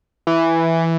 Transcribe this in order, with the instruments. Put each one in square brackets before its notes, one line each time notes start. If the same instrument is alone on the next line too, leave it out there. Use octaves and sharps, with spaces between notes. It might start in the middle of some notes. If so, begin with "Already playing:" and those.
[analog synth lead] E3